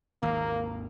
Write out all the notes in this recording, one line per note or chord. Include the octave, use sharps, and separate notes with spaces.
G#1 D#2 A#3